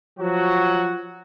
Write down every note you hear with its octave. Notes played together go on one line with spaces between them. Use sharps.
F3 F#3 F#4